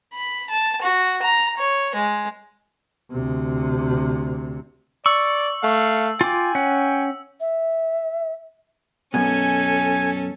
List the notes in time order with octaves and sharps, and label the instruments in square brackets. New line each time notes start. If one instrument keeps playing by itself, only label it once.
[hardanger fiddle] B5
A5
F#4
A#5
C#5
G#3
[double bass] D2 C3
[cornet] D5 [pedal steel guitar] C#6 [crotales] E6
[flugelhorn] A3 [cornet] F5
[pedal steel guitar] F4 D6 [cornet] G5 [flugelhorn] G#5
[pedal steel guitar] C#4 F#5
[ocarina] E5
[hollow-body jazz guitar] F#2 B2 [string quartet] C#4 A4 [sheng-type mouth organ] G#5